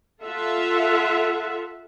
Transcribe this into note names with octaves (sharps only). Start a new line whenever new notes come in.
F4 A4 E5 F#5